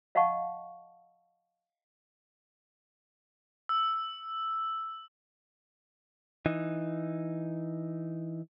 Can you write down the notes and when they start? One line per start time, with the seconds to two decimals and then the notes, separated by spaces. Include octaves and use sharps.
0.15 D#5 F5 F#5 A5 C#6
3.69 E6
6.46 E3 D#4